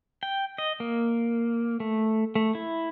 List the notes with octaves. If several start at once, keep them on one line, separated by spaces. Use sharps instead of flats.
G5
D#5
A#3
A3
A3
E4